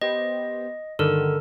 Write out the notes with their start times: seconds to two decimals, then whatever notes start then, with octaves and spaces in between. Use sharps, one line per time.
0.01 B3 G4 C5 D#5
0.99 G2 D3 D#3 A4 A#4